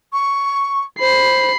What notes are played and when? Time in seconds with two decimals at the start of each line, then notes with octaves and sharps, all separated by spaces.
0.12 C#6
1.00 C5 B5 C7